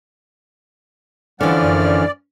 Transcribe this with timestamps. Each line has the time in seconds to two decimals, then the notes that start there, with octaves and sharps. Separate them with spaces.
1.41 D3 E3 F3 G3 C#4 D5 F#5 F6
1.62 F#2